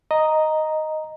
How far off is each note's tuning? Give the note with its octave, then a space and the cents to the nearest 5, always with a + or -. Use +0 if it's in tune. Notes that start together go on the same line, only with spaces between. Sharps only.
D#5 +0 A#5 +0